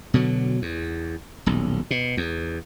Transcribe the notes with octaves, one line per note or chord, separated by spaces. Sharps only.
B2 D3 F#3
E2
D#1 B1
B2
E2